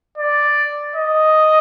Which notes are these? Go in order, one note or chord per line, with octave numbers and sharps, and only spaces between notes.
D5
D#5